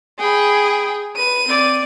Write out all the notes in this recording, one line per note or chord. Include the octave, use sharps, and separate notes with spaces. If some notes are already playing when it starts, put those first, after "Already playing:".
G#4 G5 B5
B4 D#7
C4 D5